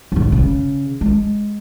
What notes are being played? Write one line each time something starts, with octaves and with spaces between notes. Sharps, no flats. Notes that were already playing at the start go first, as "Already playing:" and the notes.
D#2 G#2
C#3
G#3